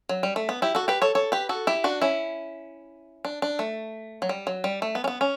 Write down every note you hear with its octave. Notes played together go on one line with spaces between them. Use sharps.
F#3
G3
A3
B3
E4 G4
F#4 A4
G4 B4
A4 C#5
A4 C#5
G4 B4
F#4 A4
E4 G4
D4 F#4
C#4 E4
D4
D4
A3
F#3
G3
F#3
G3
A3
B3
C#4
B3
C#4